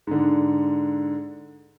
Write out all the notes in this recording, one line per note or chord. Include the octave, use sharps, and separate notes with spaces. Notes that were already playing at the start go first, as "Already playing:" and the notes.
G#2 D3